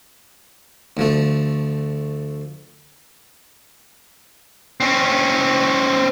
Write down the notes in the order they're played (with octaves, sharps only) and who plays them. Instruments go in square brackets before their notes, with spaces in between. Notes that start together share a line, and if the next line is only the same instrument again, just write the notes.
[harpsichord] D2 F3 A3
[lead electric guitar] C4 C#4